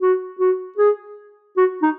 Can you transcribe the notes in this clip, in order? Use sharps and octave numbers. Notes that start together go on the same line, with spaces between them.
F#4
F#4
G#4
F#4
D#4